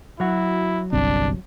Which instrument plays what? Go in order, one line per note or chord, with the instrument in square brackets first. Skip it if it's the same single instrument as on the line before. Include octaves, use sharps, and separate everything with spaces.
[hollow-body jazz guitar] F#3 F#4 [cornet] E4
[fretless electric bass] G1 C2 C4 [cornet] D4